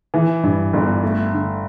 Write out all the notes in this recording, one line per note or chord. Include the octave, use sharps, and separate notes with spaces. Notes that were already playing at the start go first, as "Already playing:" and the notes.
E3
G2
G1
A3
D3